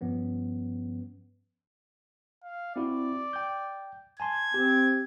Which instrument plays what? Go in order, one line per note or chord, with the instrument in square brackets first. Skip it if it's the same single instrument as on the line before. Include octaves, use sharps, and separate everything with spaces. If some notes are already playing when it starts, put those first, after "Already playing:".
[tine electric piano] G2 F3 B3 C#4
[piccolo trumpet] F5
[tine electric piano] C4 E4 F#4 [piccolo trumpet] D5
[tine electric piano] G5 G6
[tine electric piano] G#5 A5 C6 [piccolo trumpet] G#6
[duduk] C4 [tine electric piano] G4